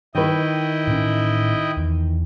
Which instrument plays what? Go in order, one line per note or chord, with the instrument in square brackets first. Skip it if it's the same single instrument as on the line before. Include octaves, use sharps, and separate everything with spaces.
[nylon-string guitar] D#3 B4 [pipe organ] E4 D#5 G5
[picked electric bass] A2 C#4
E2